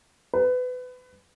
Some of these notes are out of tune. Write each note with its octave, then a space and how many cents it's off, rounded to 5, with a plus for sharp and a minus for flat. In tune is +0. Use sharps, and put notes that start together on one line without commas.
B4 +25